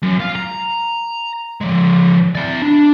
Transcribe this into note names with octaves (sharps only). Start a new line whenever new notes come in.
F#2
F4
A#5
F3 G#3
E4 D5
D4